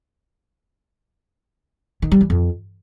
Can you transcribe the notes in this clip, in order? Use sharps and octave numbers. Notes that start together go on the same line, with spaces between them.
D#3
G3
E3
F2